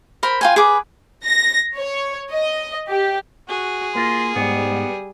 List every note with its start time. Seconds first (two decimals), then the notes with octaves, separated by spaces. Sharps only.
0.23 A#4 C5 B5
0.41 F4 G5 G#5
0.56 G#4 B4 D6
1.25 A#6
1.77 C#5
2.33 D#5
2.89 G4
3.49 F#4 G#4
3.95 A#3 F4 C6
4.36 G#2 G3 B3